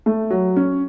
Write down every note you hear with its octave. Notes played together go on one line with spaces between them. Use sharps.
A3
F#3
C#4